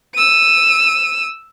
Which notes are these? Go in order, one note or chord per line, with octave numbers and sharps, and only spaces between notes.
E6 D#7